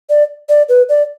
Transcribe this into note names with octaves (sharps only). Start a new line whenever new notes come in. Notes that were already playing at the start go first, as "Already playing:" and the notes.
D5
D5
B4
D5